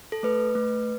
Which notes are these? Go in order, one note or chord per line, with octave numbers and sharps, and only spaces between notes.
A4
A3 B4
A3